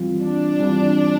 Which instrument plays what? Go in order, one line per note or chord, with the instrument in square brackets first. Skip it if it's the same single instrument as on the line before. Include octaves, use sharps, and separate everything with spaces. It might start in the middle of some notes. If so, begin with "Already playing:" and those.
Already playing: [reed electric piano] E3 G3 C4 F4
[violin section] D4
[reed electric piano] E3 G3 C4 F4